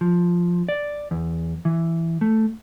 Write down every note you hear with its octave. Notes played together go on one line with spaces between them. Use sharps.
F3
D5
E2
E3
A3